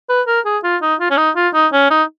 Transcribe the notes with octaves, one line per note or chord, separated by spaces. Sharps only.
B4
A#4
G#4
F4
D#4
F4
C#4
D#4
F4
D#4
C#4
D#4